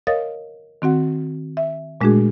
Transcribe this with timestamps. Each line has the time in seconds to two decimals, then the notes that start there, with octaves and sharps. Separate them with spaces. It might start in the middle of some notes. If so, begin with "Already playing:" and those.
0.07 A#4 C#5 D#5 F5 D#6 A6
0.82 D#3 C4 F#4 F#5
1.57 E5
2.01 A#2 G#3 A3 D4 F#4 G#4